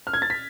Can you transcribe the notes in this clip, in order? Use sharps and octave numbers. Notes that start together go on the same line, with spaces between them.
F6
G#6
A6
B6